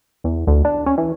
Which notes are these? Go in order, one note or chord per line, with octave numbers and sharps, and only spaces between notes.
E2
D2
D4
C#4
E3